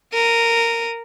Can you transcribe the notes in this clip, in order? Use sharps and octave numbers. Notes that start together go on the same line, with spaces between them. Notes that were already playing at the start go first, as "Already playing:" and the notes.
A#4 D#7